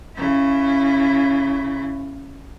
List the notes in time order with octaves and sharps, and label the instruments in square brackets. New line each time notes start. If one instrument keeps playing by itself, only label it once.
[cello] C#3 E4